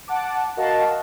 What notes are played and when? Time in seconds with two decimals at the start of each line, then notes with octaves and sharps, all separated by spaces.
0.08 F#5 A5 D6
0.57 F#4 A#4 D#5 F5 F#5 A5